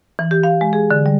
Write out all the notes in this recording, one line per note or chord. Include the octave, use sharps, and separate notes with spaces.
E3
G4
F5
G#3
G#4
D3
G3